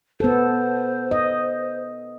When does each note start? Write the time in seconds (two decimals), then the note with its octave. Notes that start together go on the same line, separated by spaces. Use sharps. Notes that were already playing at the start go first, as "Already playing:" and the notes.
0.20 B3 A4 C5
1.11 D#5